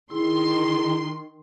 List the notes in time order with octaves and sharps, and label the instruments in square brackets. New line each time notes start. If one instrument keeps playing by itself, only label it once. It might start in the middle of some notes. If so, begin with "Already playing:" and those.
[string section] D#3 C6 [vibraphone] E4 G#4